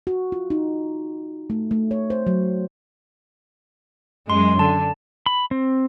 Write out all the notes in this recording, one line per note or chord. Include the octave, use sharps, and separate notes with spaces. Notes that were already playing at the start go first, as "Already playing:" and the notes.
F#4
F4
D#4
A3
A3
C#5
C5
F#3
F#2 G#3 C6
D3 A5
B5
C4